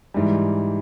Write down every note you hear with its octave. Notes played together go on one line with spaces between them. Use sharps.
G#2 E3 G3